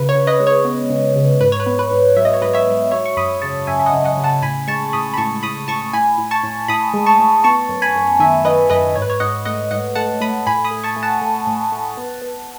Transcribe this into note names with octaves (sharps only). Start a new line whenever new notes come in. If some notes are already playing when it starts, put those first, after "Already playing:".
Already playing: C#3 B4
C#5
C#3
B4 D#5
G#3
C#5
B3
C#3
C#3
G#2 B4
C#5
B4
B3
B4
G#2
F#3 E5
D#5
C#5
G#2 B4 D#5
C#5 E5
G#2
F#3 C#5 E5
C#6
F#2 B5 D#6
C#3 A5 C#6
F#2 E5 G#5
E5
D#5 F#5
C#3
D#5 F#5
C#3
F#5 A5
A2 G#5 B5
G#3 A5 C#6
A2 B5 D#6
B5
A2 A5 C#6
A2 B5 D#6
A2 A5 C#6
A2 G#5 B5
A2
A5 C#6
A2
A2 B5 D#6
G#3
A5 C#6
A2
B3 A5 C#6
F#2
G#5 B5
F#2
D#3 E5 G#5
D#3 B4 D#5
F#2 B4 D#5
G#2 C#5
B4
C#5
G#2 D#5 F#5
A3 D#5 F#5
G#2 D#5 F#5
A3 F#5 A5
A3 B5 D#6
A2 G#5 B5
B5 D#6
A3
A5 C#6
A3
F#5 A5
A3
A2
A3
B3
B3